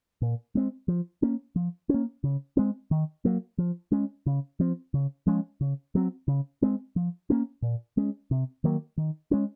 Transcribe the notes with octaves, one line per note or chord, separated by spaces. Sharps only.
A#2
G#3 C4
F3
A#3 C#4
F3
C#4
A#3
C#3
G#3 C4
D#3
F#3 A#3
F3
G#3 C#4
C#3
F3 C4
C#3
F3 G#3 C#4
C#3
F#3 C4
C#3
G#3 C4
F3
A#3 C#4
A#2
G#3 C#4
C3
D#3 F#3 A#3
D#3
G#3 C#4